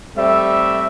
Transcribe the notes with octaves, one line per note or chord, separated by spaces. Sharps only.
G3 A3 C4 E5